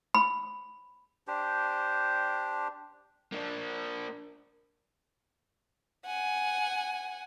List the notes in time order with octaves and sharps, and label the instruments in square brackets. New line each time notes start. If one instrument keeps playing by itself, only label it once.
[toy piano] B5
[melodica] D4 G4 C5
[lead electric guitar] A#3 D4
[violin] F#5 G#5